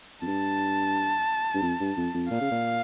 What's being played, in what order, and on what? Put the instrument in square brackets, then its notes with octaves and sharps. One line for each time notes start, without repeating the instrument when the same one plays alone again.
[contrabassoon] F2
[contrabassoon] G2 [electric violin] A5
[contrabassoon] G2
F2
G2
F2
F2
[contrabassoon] A#2 [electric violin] F5
[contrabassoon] C#3
A#2